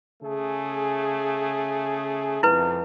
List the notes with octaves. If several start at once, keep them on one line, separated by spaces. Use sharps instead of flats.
C#3 A3 G#4
F2 E4 B4